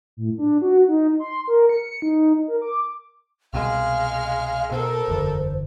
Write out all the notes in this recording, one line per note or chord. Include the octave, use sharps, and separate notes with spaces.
A2
D4
F#4
D#4
C6
A#4
C#7
D#4
A#4
D6
C2 B2 G#3 F5 F6
B2 A4 A#4 C5
F#1 E2 D3